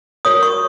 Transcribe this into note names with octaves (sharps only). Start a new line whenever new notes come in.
F#4 A#4 C#5 D#6
C#6